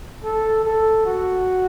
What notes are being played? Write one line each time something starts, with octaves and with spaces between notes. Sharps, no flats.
A4
A4
F#4